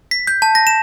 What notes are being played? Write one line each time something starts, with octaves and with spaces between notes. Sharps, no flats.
B6
G6
A5
A#6
E7